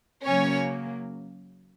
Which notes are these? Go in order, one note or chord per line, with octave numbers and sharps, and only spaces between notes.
C#3 F#3 A#3 C#4 C#5